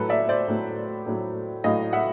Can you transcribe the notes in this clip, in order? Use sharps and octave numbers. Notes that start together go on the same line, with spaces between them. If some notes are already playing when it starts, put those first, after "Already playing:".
Already playing: A2 F#3 A3 A4 B4
D5 E5
C5 D5
A2 F#3 A3
A2 F#3 A3
A2 F#3 A3 D#5 F5
E5 F#5